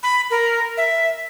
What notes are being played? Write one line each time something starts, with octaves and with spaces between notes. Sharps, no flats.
B5
A#4
E5